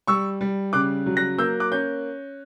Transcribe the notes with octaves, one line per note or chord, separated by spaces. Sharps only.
G3 C#6 E6
G3
C#3 D6 F#6
F#3
F#6 A#6
A#3 E6 G6
D6 F#6
C#4 G6